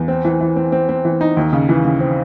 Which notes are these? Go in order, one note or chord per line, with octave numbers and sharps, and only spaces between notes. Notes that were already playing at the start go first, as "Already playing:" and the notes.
Already playing: E2
C4
E3
E3
C4
C4
C4
E3
D#4
D#2
C#3
E3
C#3
C4